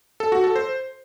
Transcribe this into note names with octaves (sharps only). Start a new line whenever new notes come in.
A4
F#4
A4
C5